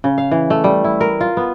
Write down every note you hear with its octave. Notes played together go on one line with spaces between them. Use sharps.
C#3
F5
E3
A3
G3
E4
A#4
F4
B3